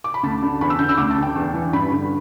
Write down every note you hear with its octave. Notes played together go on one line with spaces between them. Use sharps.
D6
B5
D2 A5
D3
E2 B5
E6
D3 G6
E6
D2 D6
A5
D3
G5
E2
E3
G2 B5
D3